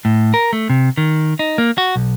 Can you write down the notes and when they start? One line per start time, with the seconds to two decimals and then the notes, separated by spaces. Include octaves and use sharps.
0.05 A2
0.34 A#4
0.53 A3
0.70 C3
0.98 D#3
1.39 D#4
1.58 A#3
1.78 F#4
1.96 B1